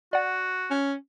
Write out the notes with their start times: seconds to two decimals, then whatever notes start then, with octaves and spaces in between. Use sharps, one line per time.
0.13 F#4 D5 F#5
0.70 C#4